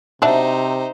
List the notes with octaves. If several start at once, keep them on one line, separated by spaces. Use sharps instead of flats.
C3 F#3 D4 D#4 C5 E5 A5